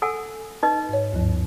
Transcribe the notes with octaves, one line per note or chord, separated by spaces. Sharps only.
A4 F#5 G#5 E6
D#4 B4 D#5
G#2 C#5
D2 G2 F3